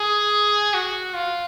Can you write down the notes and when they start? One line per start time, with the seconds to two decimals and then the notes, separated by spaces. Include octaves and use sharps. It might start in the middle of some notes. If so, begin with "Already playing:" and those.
Already playing: G#4
0.74 F#4
1.14 F4